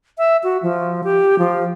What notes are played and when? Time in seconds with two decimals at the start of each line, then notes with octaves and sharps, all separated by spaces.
0.18 E5
0.43 F#4
0.62 F3
1.04 G4
1.39 F3